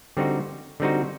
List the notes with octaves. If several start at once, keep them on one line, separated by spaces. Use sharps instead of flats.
D3 G3 C4 D#4 F#4
D3 G3 C4 D#4 F#4